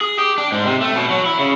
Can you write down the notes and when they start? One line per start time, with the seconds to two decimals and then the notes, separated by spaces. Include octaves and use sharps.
0.01 G#4
0.19 G4
0.38 D4
0.52 G#2
0.65 C3
0.81 A3
0.95 B2
1.10 F#3
1.26 E4
1.39 C#3